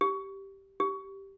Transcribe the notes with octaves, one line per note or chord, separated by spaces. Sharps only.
G4
G4